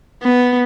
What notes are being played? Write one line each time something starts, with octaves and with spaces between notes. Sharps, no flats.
B3